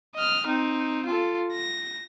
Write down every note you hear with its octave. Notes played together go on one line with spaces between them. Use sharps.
D#5 F6
C4 D#4
F4 A4
A#6